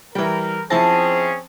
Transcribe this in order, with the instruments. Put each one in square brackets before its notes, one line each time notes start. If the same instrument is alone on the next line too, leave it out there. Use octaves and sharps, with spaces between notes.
[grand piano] E3 G3 [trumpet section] A#4 [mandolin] G5
[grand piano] F3 E4 A#6 [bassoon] C4 [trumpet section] C#4 G#4 [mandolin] A5